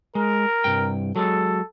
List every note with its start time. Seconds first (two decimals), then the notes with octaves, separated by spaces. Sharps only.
0.15 G#3 A#4
0.64 C2 G2 G5
1.16 F#3 G#3 A4